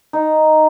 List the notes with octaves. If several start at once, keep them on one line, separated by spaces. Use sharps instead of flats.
D#4